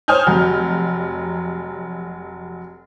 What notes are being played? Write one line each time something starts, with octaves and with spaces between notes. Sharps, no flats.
C5 C#5 G#5 D#6 F6 G6
F1 F#3